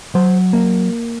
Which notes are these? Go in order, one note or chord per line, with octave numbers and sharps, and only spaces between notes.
F#3 C5
A#3